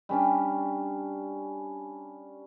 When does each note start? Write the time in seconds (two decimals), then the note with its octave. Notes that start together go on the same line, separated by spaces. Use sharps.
0.09 G3 C#4 D4